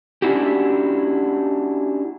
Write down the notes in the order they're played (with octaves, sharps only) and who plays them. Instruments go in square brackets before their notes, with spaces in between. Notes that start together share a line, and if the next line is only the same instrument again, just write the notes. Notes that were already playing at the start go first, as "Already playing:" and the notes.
[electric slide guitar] C#4 D4 E4 F#4 G4